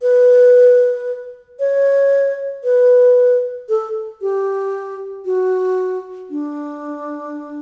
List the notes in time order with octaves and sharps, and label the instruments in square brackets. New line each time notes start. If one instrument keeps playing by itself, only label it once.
[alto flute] B4
C#5
B4
A4
G4
F#4
D4